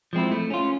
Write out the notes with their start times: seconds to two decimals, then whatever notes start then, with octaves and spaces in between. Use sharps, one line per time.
0.13 F3 G#3 C4 E4
0.32 A3
0.50 C#4 F4